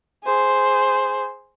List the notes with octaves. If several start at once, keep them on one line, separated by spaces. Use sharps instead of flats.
G#4 C5